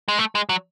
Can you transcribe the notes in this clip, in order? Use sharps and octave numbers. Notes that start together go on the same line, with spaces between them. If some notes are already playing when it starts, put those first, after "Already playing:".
G#3
A3
G#3
F#3